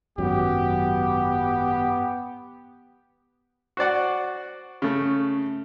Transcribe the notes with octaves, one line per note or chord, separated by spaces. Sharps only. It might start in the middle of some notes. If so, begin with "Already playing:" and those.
G#1 F#2 F#3 B3 G4
F#4 C5 D5 F#5
C#3 A3